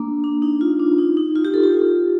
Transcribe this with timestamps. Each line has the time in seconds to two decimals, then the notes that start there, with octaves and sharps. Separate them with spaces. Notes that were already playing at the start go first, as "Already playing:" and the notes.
Already playing: A#3 D4
0.24 D4
0.42 D#4
0.61 F4
0.80 D4
0.98 D#4
1.17 D#4
1.36 F4
1.45 G4
1.54 A4
1.63 G4
1.72 F4